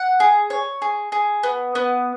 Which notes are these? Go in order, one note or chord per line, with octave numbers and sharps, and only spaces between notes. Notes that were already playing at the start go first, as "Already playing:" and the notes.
Already playing: F#5
G#4
C#5
G#4
G#4
B3
B3